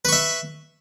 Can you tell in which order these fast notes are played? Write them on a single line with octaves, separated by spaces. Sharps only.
B4 C#6 E5